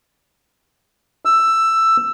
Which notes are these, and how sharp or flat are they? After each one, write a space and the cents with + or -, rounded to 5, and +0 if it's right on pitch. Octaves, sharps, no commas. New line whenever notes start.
E6 +10